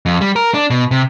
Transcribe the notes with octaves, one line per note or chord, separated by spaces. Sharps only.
F2
G3
A#4
D4
B2
C3